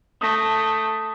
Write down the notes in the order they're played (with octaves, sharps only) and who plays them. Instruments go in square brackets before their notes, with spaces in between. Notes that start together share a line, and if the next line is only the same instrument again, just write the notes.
[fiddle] A3 [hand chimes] D#6 A#6